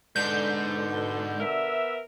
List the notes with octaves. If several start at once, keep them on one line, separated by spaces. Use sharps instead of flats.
G#2 B2 D3 G6
B3 A#4 E5